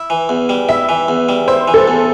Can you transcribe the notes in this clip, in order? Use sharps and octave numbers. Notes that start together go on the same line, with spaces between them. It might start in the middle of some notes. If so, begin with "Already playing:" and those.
Already playing: E4
E3
E2
G3
E4 E5
E3
E2
G3
E4 C5
E3
A4
E2